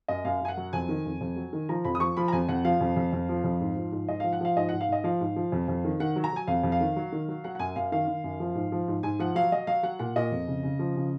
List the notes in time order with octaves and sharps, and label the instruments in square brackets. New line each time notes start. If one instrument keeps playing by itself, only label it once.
[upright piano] F#2 D#5
F#2 F5
F#2 G#5
F#5
F#3
F2 G#5
D#3
F2
F2
F#3
D#3
F3 A#5
F2 B5
D#6
F3 C#6
F3 B5
A#5
F2 G#5
F2 F#5
F3 F5
F2
F2
F2
F3
F2
G#2
F3
G#2
G#2 D#5
F3 F5
F#5
F3 F5
G#2 D#5
G#2 F#5
F5
G#2 D#5
F3 F5
G#2
F3
F2
F2
D#3
D#3 F#5
F#3
A#5
F#3 G#5
F2 F5
F2
F5
D#3
F#3
D#3
F#3
F#3 F#5
F#5
F#2 G#5
F#2 F5
D#3 F5
D#3
F#2
F3
G#2
F3
G#2
G#2 G#5
F3 F#5
F#3 F5
F#3 D#5
F#3 F5
F#3 F#5
A#2 F#5
A#2 D#5
F2
C#3
C#3
F3
C#3